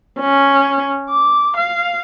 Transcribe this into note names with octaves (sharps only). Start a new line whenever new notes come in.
C#4
D6
F5